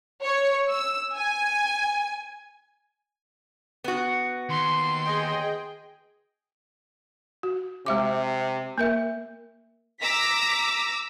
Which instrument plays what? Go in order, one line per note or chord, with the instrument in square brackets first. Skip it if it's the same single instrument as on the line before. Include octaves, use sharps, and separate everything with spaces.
[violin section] C#5
E6
G#5
[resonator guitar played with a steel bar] B3 F#4
[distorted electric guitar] D#2 [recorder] C6
[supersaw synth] G#4 D#5 G5
[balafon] F#4
[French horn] C3 [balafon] G#3 E5 D6
[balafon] A#3 A#4 E5
[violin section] A#5 D6 E6 A#6 B6